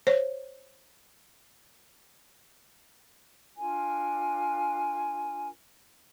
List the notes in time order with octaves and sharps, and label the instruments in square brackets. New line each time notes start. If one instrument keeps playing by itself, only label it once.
[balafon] C5 C#5
[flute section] D4 F4 A#4 G#5